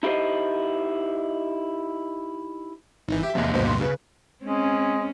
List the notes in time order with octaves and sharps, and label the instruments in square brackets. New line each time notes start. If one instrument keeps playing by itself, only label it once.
[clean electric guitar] D#4 E4 G4 A4 C5 D#5
[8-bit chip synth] G#1 E3 [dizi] D#4
[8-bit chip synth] G4 [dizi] E5
[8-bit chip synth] E2 C3 [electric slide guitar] F3 A#3 D#5
[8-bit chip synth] D2 G2 B2 [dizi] C5
[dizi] C6
[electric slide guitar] C#3 [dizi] B4
[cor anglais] G#3 [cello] C4 C#4